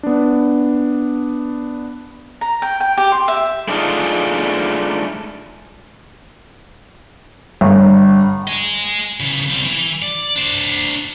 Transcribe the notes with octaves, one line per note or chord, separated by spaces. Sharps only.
B3 D4
A#5
G5
G5
G4
C6
E5
G#3 A3 D4 D#4 F4
G1
D#5 G#5
C#3 E3
G3 C4
E3
D5
D4 C5